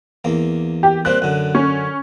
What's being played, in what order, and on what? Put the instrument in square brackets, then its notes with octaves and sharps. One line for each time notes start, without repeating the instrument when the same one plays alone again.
[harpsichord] E2 A#3
[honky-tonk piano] G4
[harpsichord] G3 A#3 C4 [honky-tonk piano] F#6
[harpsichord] F#2 D3
[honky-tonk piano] C#4